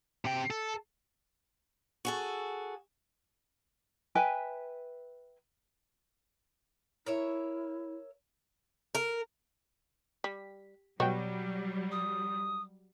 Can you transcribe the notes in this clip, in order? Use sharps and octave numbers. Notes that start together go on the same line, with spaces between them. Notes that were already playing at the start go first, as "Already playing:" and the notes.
C3 G5
A4
F#4 G#4 A4
B4 E5 G5 G#5
E4 A#4 C#5 E5
A#4
G3 B6
B2 F#3 G3 F#4 C#5 G5
D#6